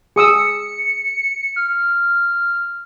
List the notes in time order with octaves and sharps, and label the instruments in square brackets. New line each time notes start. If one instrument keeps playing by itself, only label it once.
[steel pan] G#4 D#6 E6 [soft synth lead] C#7
[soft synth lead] F6